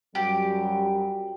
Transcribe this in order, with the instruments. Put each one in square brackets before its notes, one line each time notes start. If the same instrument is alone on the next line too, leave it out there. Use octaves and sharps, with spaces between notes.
[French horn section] F#2 F#3 G3 [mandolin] G4